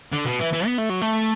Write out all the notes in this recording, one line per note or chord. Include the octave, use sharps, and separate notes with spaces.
D3
B2
E3
E3
B3
A3
F#3
A3